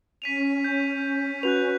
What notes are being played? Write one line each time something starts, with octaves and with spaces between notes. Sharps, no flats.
C#4 B6 D#7 F7
G6
F#4 B4 F#6 F7